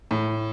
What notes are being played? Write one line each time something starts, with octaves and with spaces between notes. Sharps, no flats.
A2